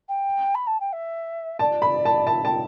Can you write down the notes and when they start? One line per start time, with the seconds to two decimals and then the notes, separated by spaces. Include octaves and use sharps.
0.09 G5
0.55 B5
0.67 A5
0.80 G5
0.93 E5
1.59 D5 A5
1.82 B5
2.05 A5
2.27 E5 A5
2.44 G5 A5